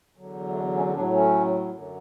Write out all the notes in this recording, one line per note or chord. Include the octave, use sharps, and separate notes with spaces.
E2 D3 F#3
A3
G#3 B3
A3 C#4
A2 F#3 B3 D4
A3 C#4
F#2 D3 F#3